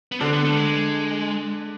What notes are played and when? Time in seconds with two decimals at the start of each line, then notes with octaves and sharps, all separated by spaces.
0.12 B3
0.20 D3 C4 D4
0.33 B3
0.45 A3
0.52 G3
0.56 G#3